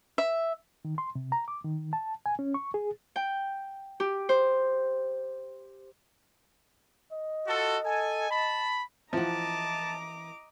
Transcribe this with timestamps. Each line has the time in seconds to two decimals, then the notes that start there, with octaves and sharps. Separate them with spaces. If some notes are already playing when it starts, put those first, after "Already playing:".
0.18 E5
0.85 D#3
0.98 C6
1.16 C3
1.32 A#5
1.48 D6
1.64 D#3
1.93 A5
2.26 G#5
2.39 C#4
2.54 C#6
2.74 G#4
3.16 G5
4.00 G4
4.29 C5
7.12 D#5
7.46 F4 F#4 A4
7.84 A4 G#5
8.30 A5 B5
9.13 E3 F3 D#5 F#5 A5 A#5 D6